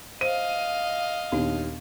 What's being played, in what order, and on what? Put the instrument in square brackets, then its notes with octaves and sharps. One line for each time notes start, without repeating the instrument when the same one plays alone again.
[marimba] C5 [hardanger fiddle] D#5 F5 [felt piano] D#7
[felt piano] D#2 [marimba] A#2 B3 D4